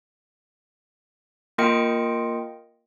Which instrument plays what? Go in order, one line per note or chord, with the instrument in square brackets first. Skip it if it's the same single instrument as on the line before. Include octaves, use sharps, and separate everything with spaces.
[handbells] A#3 F4 A#4 D#5 G5 C#7